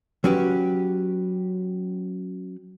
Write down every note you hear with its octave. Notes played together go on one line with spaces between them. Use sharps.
F#3 C#4 F#4 G4 B4